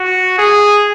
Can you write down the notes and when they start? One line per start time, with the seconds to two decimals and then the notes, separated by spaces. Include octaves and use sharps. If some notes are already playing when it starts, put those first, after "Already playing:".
Already playing: F#4
0.38 G#4